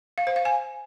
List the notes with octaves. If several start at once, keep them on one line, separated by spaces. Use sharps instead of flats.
F5
C5
F5
G#5